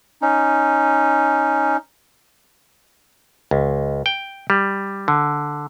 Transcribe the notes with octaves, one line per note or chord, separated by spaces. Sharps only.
C#4 D#4
C#2
G5
G3
D3